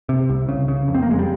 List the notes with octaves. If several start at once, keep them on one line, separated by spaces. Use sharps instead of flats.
C3
C2
C#3
C#3
F2
C4
A#3
F2 G#3
G3